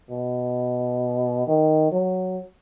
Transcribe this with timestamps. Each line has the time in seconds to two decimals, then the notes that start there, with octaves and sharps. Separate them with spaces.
0.10 B2
1.47 D#3
1.92 F#3